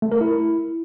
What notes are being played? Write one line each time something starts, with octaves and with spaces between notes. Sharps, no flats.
A3
A#4
E4